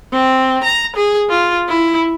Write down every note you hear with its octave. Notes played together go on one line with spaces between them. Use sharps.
C4
A#5
G#4
F4
E4